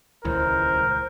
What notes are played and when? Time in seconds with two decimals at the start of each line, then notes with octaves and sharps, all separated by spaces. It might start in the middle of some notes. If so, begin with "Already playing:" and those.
0.25 D#1 C#2 E3 A#4 C5